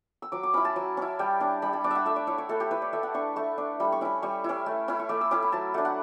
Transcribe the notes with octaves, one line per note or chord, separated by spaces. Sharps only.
E6
F#3 D6
D6
C#4 E4 B5
A5
F#3
C#4 E4
G3 G5
D4 A5
G3 B5
A5
D4 D6
E5 F#5
A3 E5
D5
E4 C#5
C#5
A3 A4
G4
E4 B4
D5
A3 E5
F#5
D4 C#6
A3 C#6
D4
G3 B5
C#6
C#4 E4 B5
G3 C#6
C#4 E4
A3
C#4 E4 B5
C#6
A3 D6
E6
C#4 E4 D6
B5
F#3 A5
A3 D4 F#5
F#5